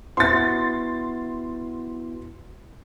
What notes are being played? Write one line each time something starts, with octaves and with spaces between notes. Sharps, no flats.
B3 E4 F#4 C6 A6